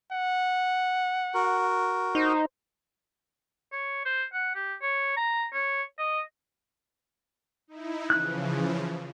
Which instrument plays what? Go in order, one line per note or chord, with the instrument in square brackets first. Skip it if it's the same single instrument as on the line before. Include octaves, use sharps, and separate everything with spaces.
[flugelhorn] F#5
[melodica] F#4 A#4
[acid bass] D#4 [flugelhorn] C5
[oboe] C#5
C5
F#5
G4
C#5
A#5
C#5
D#5
[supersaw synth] D#4 E4
[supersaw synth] C#3 E3 F3 [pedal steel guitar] F#6